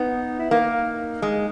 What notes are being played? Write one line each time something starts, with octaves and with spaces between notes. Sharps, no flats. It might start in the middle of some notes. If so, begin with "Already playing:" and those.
Already playing: B3 D#4
E4
A#3 D#4
G#3